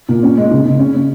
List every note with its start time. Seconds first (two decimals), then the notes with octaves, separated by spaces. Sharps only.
0.09 A#2
0.23 C#4
0.37 G#3
0.51 C#3
0.65 C#3
0.79 C#4
0.94 C#4